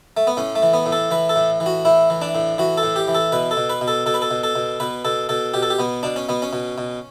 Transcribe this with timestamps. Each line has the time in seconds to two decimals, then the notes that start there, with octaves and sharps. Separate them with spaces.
0.17 A3
0.27 B3
0.37 A2 C#4
0.55 A3
0.62 E3
0.73 B3
0.86 A2
0.92 A4
1.11 E3 B4
1.29 A4
1.36 A2
1.60 E3
1.66 F#4
1.85 A2 E4
2.10 E3
2.22 D4
2.35 A2
2.58 E3 F#4
2.77 A4
2.83 A2
2.96 G4
3.08 E3
3.15 A4
3.32 B2 B4
3.51 A4
3.57 B2
3.70 B4
3.81 B2
3.88 A4
4.06 B2 A4
4.14 B4
4.22 A4
4.31 B2
4.43 A4
4.56 B2
4.80 B2 B4
5.05 B2 A4
5.29 B2 A4
5.54 B2 G4
5.63 A4
5.70 G4
5.79 B2 B3
6.03 B2 D4
6.16 C#4
6.29 B2 B3
6.42 C#4
6.53 B2
6.78 B2